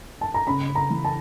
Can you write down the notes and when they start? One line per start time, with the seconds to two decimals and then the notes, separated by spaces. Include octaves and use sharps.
0.21 A5
0.34 A#5
0.47 C#3 B5
0.69 C#3
0.75 A#5
0.90 E3
1.05 A5